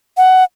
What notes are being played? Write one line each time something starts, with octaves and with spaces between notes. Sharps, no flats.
F#5